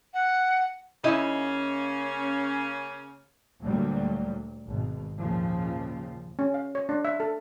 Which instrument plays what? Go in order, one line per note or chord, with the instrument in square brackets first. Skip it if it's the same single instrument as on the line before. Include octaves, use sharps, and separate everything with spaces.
[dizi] F#5
[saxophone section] C#3 A#3 C#4 [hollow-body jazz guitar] D#4 E4 D#5
[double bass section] D2 A#2 F#3 G3 A#3
G#1 B2
D#2 A#2 C#3 F3
[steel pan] C#4
F5
C#5
D4
E5
A4